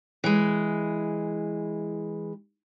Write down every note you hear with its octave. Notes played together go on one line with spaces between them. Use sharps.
E3 G#3